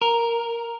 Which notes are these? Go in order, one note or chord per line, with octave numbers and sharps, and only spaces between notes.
A#4